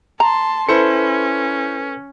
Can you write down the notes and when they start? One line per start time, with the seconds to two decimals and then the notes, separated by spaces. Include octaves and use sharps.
0.20 A5 A#5 C6
0.69 C#4 E4 A4 B4 C5 C#7